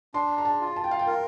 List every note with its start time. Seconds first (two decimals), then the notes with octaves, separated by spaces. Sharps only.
0.14 D4 C6
0.38 A#5
0.45 A5
0.61 F4
0.76 A5
0.84 G5
0.91 F5
0.99 G5
1.07 A#4 F5